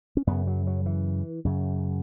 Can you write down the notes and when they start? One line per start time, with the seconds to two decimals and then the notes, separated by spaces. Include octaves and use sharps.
0.17 C#4
0.27 F#2 C#3 B3
0.47 F#3
0.67 F#3
0.86 E3
1.45 F#2 C#3